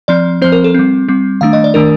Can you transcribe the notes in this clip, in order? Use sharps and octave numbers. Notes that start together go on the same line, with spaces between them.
F3 C4 D5
F3 C4 C5
A#4
A4
G3 C4
G3 C4
D#3 A3 D4 F5
D#5
D5
D#3 A3 D4 A#4